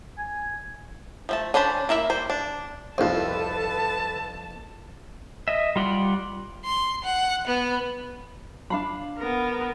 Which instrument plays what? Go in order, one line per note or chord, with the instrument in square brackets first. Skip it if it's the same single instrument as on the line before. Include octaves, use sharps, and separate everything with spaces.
[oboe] G#5
[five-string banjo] F3 A3 A5
C#4 D4 C5 A5 B5
A#3 E4 A#4 E5
G3 A#3 C5
D4
[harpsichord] C2 F2 [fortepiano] F3 C4 [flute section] A4 B4 [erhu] A5
[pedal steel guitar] D#5 E5
G3 F4 D5 F#5
[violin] C6
F#5
B3
[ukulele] D4 F5 B5
[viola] B3 A#4